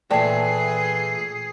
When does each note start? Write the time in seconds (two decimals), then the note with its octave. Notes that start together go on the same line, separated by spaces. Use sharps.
0.11 A#2 E3 A3 G#4 D5 G5 A5 C7